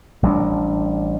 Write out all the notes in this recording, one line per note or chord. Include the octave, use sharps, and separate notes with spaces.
A1 G3 C4 D4